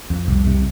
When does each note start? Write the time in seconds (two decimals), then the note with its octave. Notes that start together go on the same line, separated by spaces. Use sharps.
0.10 F2
0.28 C2
0.47 C3